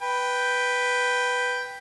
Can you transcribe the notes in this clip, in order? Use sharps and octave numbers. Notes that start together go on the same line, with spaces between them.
B4 G5